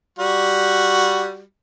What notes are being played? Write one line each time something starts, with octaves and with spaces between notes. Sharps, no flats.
G3 F#4